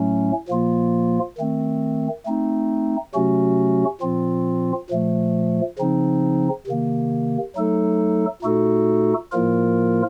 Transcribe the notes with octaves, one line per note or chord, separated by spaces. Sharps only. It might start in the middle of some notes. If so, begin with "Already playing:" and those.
Already playing: A2 F#3 A3 C#4
A#2 F3 A#3 F4
D#3 A3 C4
A3 C4 D#4
C3 F#3 A3 C#4 F#4
A#2 F3 C4 F4
A#2 F3 A3
C#3 F3 C4 D#4
C3 D#3 A#3
F#3 A3 D#4 A4
A#2 A3 D#4 F#4 A4
A2 F3 A#3 F4 A#4